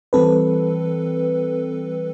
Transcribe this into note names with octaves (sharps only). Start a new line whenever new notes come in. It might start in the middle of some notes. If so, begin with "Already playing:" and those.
E3 G3 C4 A4 B4